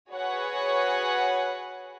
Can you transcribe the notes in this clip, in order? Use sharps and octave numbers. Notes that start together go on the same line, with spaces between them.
F#4 G#4 B4 C#5 F#5